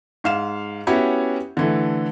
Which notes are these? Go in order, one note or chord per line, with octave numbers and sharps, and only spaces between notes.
G#2 F5 E7
B3 C#4 E4 F#4 G4 C#5
D3 E3 A3